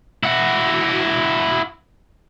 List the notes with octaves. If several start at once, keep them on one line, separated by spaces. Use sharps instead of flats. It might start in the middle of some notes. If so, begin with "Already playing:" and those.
E4 F#4